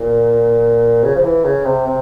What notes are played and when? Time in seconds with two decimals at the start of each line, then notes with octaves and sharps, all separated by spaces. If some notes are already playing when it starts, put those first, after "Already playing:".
Already playing: A#2
1.04 C#3
1.16 F3
1.24 E3
1.44 C#3
1.65 C3
1.86 C3